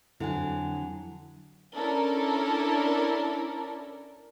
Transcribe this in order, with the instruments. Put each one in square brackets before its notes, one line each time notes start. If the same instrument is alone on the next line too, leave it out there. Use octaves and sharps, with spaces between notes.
[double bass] F2 F#3 [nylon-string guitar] D3 [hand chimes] E4 F#5 G#5
[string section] C#4 D4 E4 A4 A#4